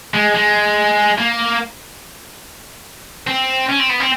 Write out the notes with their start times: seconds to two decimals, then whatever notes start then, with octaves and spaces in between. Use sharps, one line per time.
0.14 G#3
0.35 G#3
1.18 A#3
3.27 C4
3.69 C#4
3.79 C4
3.90 B3
4.00 C4